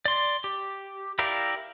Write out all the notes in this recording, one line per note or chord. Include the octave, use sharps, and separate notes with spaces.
D5 C6
G4
E4 G4 A#4 D5 F5